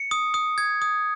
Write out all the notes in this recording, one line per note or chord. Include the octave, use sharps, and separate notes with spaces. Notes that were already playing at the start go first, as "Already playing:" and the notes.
Already playing: C#7
D#6
D#6
G#6
D#6